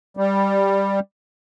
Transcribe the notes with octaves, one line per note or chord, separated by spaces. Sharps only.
G3